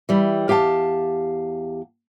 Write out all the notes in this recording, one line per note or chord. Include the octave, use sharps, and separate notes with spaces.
E3 G3
E2 G4 F5 G5 A5